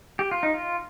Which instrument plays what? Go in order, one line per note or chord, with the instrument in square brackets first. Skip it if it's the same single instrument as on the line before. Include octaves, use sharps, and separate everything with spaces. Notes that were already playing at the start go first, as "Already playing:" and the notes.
[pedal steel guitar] G4
F4
D#4
F4